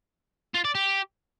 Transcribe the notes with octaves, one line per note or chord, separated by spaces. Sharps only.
F4
D5
G4